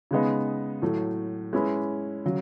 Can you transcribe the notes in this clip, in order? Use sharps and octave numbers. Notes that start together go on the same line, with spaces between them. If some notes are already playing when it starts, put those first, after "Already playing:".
C#3 G#3 B3 D#4
A2 F#3 A3
G#3 C#4 E4 B4
C#3 F#3